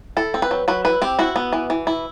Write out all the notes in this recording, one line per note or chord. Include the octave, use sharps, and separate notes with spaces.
E4 A4
C4
B4
F#3
F#3 B4
E4 B4
C4 G4
E4 F#4
B3
E3
E3
E4